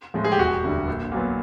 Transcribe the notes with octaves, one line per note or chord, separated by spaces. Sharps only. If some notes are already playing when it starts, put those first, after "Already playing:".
A2 F3 G#3
G#4
G4
E1 F#4
D2 D3 G3
A#1
A#2 F#3 B3